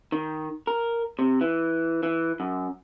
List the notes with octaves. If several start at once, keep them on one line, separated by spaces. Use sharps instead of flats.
D#3
A#4
C3
E3
E3
F#2